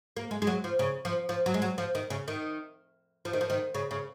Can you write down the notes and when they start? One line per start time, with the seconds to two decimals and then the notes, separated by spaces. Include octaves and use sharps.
0.17 A#3
0.31 G#3
0.42 G#3
0.47 F#3
0.64 F3
0.79 C#3
1.05 F3
1.29 F3
1.46 F#3
1.54 G#3
1.62 F#3
1.78 F3
1.95 D#3
2.10 C#3
2.28 D#3
3.25 F3
3.33 D#3
3.41 F3
3.50 D#3
3.74 C#3
3.91 C#3